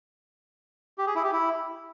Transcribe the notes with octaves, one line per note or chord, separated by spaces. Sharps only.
G4
G#4
E4
G4
E4